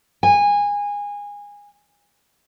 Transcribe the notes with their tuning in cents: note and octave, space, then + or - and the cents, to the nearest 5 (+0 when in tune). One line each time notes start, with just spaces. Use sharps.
G#5 -20